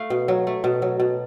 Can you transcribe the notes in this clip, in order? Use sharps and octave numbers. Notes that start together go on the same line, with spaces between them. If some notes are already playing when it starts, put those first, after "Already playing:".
Already playing: A3 F5
B2
F#3
A3
B2
F#3
B2